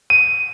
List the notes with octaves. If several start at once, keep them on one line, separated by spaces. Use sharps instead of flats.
D#7